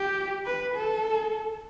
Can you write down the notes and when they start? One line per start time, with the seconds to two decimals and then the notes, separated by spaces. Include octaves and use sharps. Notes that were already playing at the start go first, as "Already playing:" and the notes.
Already playing: G4
0.46 B4
0.75 A4